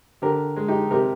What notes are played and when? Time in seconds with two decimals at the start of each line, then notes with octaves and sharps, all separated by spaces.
0.22 D3 G4 A#4
0.56 G#3
0.68 D#4 G4
0.91 C3 G4 A#4